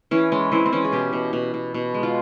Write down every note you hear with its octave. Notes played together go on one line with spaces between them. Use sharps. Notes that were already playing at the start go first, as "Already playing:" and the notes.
E3 C#4
G#3 C#4
E3 C4
C4
E3 C#4
G#4
B2 G4
B2
B2
B2
B2
G#3
F4